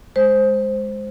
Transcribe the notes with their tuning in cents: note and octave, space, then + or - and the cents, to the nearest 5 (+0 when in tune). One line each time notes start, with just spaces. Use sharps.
G#3 +0 C5 +0